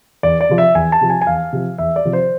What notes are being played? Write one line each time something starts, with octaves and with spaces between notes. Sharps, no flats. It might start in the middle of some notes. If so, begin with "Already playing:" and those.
E2 D5
D5
C3 F3
E5
E2 G#5
A5
C3 F3
G#5
G#5
E2 F5
C3 F3
E2 E5
D5
C3 F3
C5